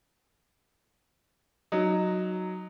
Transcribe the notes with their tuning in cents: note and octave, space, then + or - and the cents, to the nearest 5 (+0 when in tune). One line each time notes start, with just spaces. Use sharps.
F#3 +0 D#4 +0